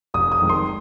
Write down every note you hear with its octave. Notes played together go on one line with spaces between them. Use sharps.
F1 D#6
D#6
F2 D#3 G#3
C6